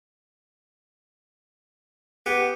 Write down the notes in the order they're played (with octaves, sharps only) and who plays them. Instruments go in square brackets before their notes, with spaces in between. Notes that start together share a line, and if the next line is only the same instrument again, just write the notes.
[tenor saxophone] B3 [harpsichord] G4